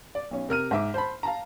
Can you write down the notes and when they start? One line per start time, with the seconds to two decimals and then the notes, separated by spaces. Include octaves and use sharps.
0.15 D5
0.31 B1 C#4
0.49 C3 A#4 F6 D#7
0.71 G#2 E5 D6
0.94 C5 A5 B5
1.23 F5 A5 A#5